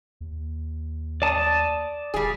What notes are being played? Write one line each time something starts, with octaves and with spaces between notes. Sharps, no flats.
D#2
D5 A5 D#6
E1 G3 G#4